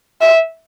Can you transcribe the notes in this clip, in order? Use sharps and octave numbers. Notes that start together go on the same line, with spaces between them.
E5